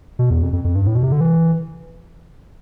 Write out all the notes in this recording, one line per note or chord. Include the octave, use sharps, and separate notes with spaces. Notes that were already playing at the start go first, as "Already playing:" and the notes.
B2
E2
F2
F2
F2
G2
A2
B2
C3
D3
E3